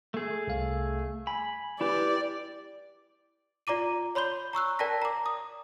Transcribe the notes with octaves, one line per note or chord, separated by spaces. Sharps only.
A3 G#4
C2 F5
G#5 B5
E4 G4 B4 D5
F4 D5 A#5 D6 D#7
C#5 B5 C6 G6 G7
A#5 C#6 E6 F#6
A#4 D5 G5 A5 A#6 B6
A#5 D6
D#6